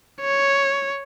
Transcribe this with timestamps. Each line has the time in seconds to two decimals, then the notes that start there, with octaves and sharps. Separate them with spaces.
0.21 C#5